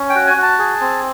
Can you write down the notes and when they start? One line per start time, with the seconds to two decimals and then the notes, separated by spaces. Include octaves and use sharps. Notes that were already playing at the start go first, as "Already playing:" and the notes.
Already playing: C#4
0.10 G5
0.15 F#4
0.27 G#5
0.37 F#4
0.43 A5
0.59 G#4
0.81 C4